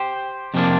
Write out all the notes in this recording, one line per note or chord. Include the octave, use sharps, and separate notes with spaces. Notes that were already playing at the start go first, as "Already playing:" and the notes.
Already playing: G4 C5
F2 C3 F3 A#3 D4